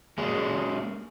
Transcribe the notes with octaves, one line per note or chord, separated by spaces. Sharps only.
G#3 A#3 C#4 F#4 G#4